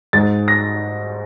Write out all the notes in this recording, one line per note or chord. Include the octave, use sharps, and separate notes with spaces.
G#2 A6
A#6